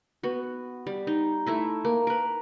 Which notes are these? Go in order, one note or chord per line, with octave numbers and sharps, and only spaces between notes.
B3 F#4
G3
D#4
A3 E4 E5
A#3
A#4 B4